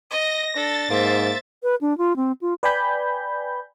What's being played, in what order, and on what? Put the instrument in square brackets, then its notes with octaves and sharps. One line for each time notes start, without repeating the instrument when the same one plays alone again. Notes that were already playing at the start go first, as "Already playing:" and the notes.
[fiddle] D#5 [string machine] A#6
[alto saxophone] D4 [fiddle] A4 [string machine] A6
[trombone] G#2 [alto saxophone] A#3 [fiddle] C5 E5
[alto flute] B4
D4
F4
C4
F4
[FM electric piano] B4 D5 G5 G#5 B5 G6